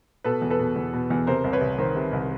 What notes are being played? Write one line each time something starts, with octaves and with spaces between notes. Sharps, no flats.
B2 A4 B4
E2
A4 B4
B2
E2
B2
E2
C3 A#4 C5
C2
B4 C#5
C2
D#3 A#4 C5
C3
C2